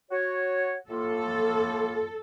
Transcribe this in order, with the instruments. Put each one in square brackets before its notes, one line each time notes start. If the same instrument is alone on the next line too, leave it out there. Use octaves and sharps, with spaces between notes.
[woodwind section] F#4 C#5
[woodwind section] A2 A#3 F4 [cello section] A4